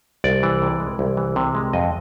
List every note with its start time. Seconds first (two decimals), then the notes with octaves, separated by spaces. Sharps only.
0.24 C2 D5
0.43 E3
0.62 C3
0.80 G#3
0.99 C2
1.17 E3
1.36 C3
1.55 G#3
1.73 F2 D#5